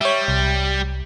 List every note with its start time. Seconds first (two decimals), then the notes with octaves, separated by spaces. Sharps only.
0.01 G3 C#5 E5
0.28 C2